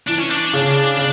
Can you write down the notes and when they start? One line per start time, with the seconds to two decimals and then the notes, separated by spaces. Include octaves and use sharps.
0.08 E3 D4
0.19 C#4
0.30 D4
0.53 C#3
0.97 C#3